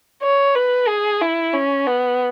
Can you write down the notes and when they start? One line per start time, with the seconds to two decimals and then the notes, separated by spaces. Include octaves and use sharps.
0.22 C#5
0.55 B4
0.88 G#4
1.21 E4
1.53 C#4
1.87 B3